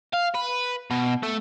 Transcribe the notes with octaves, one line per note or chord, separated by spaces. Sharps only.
F5
B4
B2
A3